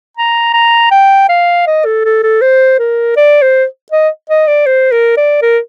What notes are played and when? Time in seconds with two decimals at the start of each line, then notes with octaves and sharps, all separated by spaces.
0.17 A#5
0.53 A#5
0.91 G5
1.29 F5
1.66 D#5
1.85 A4
2.05 A4
2.23 A4
2.41 C5
2.79 A#4
3.17 D5
3.42 C5
3.92 D#5
4.29 D#5
4.47 D5
4.66 C5
4.92 A#4
5.17 D5
5.42 A#4